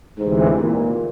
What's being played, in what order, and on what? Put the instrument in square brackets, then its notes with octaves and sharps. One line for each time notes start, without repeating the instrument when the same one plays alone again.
[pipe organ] D2 C3 E3 [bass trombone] G#2
[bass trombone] A#2